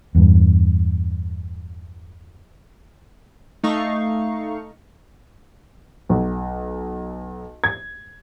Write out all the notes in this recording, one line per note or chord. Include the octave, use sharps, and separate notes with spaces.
E2 G2
A3 D#4 F5 C#6
B1
G#6